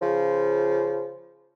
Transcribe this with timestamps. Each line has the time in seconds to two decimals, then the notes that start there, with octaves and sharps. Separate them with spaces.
0.01 C#3 F3